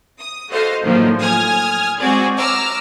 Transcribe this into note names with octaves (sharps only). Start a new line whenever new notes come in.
D#6
F#4 A4 C5 D#5 F5
A2 D3 D#3 F3 F#3 A#3
G#5 D#6 F6 G#6
G#3 C4 F#4 G#4 D5
A#5 D6 E6 F6